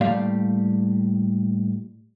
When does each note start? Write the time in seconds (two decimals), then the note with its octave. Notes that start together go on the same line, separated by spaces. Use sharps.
0.01 A2 G3 A#3 D5 F5